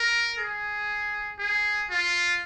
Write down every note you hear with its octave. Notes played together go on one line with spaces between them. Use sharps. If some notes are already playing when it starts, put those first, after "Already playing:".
Already playing: A#4
G#4
G#4
F4